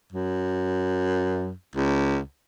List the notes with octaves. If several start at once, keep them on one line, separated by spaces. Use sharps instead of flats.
F#2
C#2